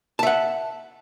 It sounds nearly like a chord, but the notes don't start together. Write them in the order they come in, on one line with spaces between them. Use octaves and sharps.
A5 E5 F#5